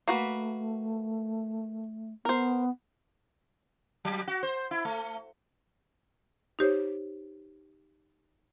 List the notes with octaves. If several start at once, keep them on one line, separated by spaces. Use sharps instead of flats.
A3 A#3 F#4 B4
B3 A#4 C5
F#3
F#4
C5
E4
A3
D#4 G4 C5 C#5